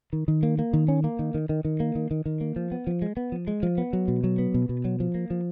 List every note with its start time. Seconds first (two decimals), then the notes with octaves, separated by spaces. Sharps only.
0.13 D#3
0.28 D#3
0.43 A#3
0.59 A#3
0.73 D#3
0.88 C#4
1.04 A#3
1.19 D#3
1.34 D#3
1.49 D#3
1.65 D#3
1.80 A#3
1.95 D#3
2.11 D#3
2.26 D#3
2.41 A#3
2.56 F3
2.72 B3
2.87 F3
3.02 G#3
3.17 B3
3.32 F3
3.47 G#3
3.63 F3
3.78 B3
3.93 F#3
4.08 B2
4.24 F#3
4.39 B3
4.54 B2
4.69 B2
4.85 F#3
5.00 F3
5.15 A#3
5.30 F3